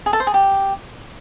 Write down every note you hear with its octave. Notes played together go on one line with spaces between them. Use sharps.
G#4
A4
C5
G#4
G4